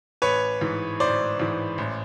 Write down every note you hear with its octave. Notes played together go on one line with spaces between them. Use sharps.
A1 B4 C#5
G#2 E3
A1 C5 D5
G#2 E3
A1